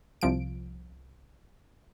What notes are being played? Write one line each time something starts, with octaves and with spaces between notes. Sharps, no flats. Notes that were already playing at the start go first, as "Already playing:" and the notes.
C2 F3 D7